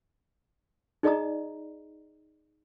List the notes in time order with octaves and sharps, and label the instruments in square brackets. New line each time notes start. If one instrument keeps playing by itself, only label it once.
[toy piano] D#4 G#4 D5 D#5 A#5 D#6